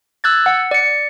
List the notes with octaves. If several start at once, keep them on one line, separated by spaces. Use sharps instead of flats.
E6 F#6 G#6 A6
F#5
D5 C#7